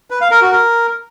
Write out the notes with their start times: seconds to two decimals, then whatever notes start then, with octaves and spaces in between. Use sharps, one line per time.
0.10 B4
0.21 F5
0.31 A#4
0.41 F#4
0.52 A#4